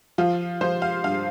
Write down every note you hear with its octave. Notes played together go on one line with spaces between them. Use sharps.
F3 F4
F3 C5
F5
G2 F5